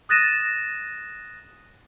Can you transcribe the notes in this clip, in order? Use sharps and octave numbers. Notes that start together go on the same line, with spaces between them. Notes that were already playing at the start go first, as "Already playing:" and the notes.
D#6 F#6 A6 A#6 D#7 E7